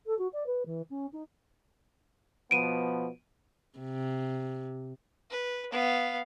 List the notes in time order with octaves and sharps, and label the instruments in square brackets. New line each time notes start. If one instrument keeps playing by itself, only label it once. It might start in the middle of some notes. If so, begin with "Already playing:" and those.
[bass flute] A4
F#4
D5
B4
E3
C#4
D#4
[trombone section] B2 F3 B3 [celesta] D7 D#7
[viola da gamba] C3
[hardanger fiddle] B4
B3 F5